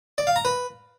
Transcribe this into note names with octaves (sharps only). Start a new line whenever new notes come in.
D5
F5
A#5
B4